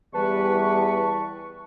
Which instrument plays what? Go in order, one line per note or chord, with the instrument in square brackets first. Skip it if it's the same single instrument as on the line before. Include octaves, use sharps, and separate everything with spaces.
[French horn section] E2 E3 G3 [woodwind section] B4 C#6 [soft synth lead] A5